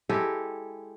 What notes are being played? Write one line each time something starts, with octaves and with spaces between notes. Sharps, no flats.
G#3 E4 G4 A4